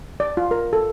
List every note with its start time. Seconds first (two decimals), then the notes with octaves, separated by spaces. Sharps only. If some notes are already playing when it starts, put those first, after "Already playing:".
0.20 D5
0.37 F4
0.51 A#4
0.73 A4